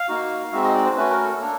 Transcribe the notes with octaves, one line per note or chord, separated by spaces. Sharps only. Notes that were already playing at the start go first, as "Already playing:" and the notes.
Already playing: F5
A#3 D#4 F#4
G#3 C4 D#4 F#4 E5
D#5
D5
C5
A3 C#4 F#4 B4
A#4
A4
A#3 D4 A4